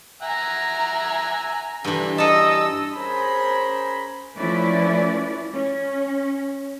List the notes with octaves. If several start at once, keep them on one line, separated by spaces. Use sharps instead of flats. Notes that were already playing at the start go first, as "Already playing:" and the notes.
E5 F#5 G#5 A#5
G2 D3 E3
A4 D#5 A5 A#5 E6
C#4 G#4 A#4 C5 B5 C6
F3 A3 C#4 E4 B4 D5
C#4